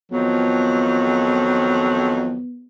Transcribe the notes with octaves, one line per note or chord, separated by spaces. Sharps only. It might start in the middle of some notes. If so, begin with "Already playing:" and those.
F2 D#3 F#3 B3